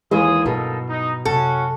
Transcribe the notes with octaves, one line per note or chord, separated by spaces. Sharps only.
D#2 E3 G#3 G#4 D#6
G2 B2 F#3 A#3 D#4 A4
D#4
F#2 C3 C#4 F#4 A4